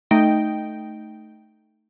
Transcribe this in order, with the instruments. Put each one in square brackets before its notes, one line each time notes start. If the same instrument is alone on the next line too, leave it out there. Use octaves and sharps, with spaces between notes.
[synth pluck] A3 D#4 D#5 G5